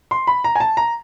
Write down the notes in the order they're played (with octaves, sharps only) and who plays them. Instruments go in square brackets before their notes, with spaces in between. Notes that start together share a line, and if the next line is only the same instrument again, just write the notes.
[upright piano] C6
B5
A#5
G#5
A5
A#5